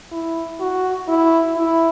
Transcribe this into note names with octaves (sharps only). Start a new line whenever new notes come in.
E4
F#4
E4
E4